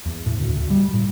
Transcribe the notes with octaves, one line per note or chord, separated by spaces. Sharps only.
E2
A2
D2
D2
G3
A2